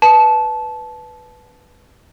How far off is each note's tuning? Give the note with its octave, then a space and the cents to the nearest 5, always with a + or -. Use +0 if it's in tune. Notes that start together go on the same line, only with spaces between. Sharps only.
B4 +0 A5 -20